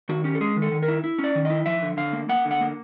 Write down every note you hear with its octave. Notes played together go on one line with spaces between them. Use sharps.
D#3 F#4
C#4 G4
A4
G#3 G#4
D#3
A4
D#3
A#4
E4
E4
C#4
D5
D#3
E4 D#5
F3 E5
D3
D3 F5
A#3
A#3 F#5
D3
F#5
A#3